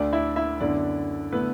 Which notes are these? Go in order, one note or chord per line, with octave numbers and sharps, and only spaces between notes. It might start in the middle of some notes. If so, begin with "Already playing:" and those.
Already playing: D2 D3 A3 D4 D5
E4 E5
E4 E5
F#2 D3 B3 D4 E4 D5
D3 A3 B3 E4 B4